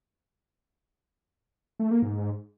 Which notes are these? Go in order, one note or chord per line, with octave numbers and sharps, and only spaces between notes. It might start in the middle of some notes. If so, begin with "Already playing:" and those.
A3
A#3
G#2